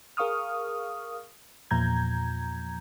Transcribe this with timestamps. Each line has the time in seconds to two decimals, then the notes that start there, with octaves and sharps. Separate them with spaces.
0.17 G#4 A#4 F5 C#6 D#6 F6
1.71 E2 A#2 F3 A#5 G6 G#6